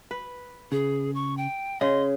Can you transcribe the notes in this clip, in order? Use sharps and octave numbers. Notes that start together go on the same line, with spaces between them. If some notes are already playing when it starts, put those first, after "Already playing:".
B4
C#3 G#4
C#6
G5
C#3 G#4 D#5 C6